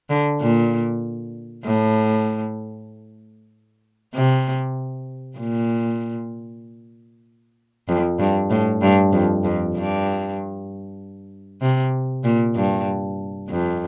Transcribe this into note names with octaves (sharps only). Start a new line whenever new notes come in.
D3
A#2
A2
C3
A#2
F2
G2
A2
G2
F2
F2
G2
C3
A#2
G2
F2